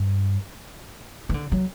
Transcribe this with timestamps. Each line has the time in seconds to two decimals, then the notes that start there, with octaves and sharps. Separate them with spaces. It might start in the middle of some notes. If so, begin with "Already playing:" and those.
Already playing: G2
1.29 E3
1.34 D3
1.52 F#3